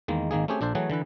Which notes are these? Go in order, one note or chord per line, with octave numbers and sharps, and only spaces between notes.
E2 D#3 G#3 A#3
G#1 D#3 A#3 G#4
A3 C4 C#4 G4 G#4
A#1 D4 A4 C5
E3 F#3 A3 F#4 G#4 C#5
D3 E3 E4 B4